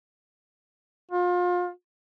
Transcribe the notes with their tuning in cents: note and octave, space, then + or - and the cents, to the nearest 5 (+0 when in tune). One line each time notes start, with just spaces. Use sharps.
F4 +30